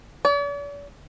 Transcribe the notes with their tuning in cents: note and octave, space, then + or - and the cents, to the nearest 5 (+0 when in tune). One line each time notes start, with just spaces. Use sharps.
D5 -45